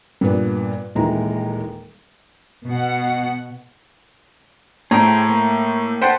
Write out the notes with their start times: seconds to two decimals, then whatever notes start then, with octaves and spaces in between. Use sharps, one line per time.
0.21 G2 A#2 B3
0.95 D#1 D#2 E3 G#3 A#5
2.67 B2 F#5
4.91 A2 A3 G#4 C5 G5 A#5
5.29 A#3
6.01 A4 B4 C5 F#5 G5